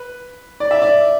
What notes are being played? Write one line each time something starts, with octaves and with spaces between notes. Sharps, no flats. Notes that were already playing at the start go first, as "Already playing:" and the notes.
Already playing: B4
D5
E5
D5